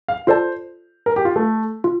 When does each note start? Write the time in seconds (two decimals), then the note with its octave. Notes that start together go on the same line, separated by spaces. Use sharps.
0.08 F5
0.27 F4 A4 C5 D5 A5
1.06 A#4
1.16 G4
1.25 F4
1.36 A3
1.84 F4